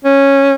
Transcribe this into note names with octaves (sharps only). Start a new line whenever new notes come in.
C#4